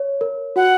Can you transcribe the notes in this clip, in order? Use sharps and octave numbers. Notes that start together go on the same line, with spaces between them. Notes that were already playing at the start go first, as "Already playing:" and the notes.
Already playing: C#5
A#4
F#4 F#5